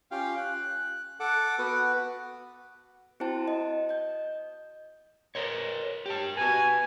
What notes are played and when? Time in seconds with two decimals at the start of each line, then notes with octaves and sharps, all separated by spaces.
0.11 C#4 F4 G4 F5 G5
0.37 F#6
1.20 A4 F#5 D6
1.59 B3 F#4 B4
3.20 C4 E4 F#4 C5 G5 A5
3.48 D#5
3.89 D#5 G6
5.35 A#4 C5 C#5
6.06 G4 A5
6.37 F#4 B4 G#5